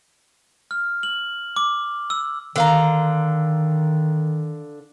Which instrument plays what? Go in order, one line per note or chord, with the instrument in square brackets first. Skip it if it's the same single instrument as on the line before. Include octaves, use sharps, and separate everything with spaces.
[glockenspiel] F6
F#7
D6
E6
[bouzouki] D3 F5 A#5 [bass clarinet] D#3